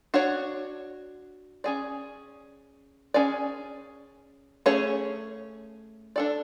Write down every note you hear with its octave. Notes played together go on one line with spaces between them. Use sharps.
D4 F#4 C#5
C#4 G#4 D5
C#4 G#4 D5
A3 C#4 G#4 C#5
D4 A4 D5